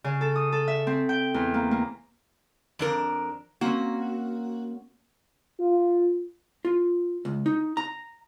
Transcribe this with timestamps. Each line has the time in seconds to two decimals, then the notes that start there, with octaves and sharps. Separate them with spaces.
0.04 C#3
0.21 A4
0.36 D#6
0.52 A4
0.68 E5
0.87 C4
1.09 G5
1.34 E2
1.54 A#3
1.71 A#3
2.79 F2 D4 A#4
3.61 A#3 C4 C#4 F#4
5.60 F4
6.65 F4
7.25 C#2
7.46 D#4
7.77 A#5